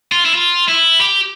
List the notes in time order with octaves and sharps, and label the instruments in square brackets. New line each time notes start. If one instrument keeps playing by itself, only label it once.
[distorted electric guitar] F4
E4
F4
E4
G4